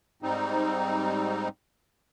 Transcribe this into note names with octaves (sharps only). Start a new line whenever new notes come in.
G#2 G3 C4 D#4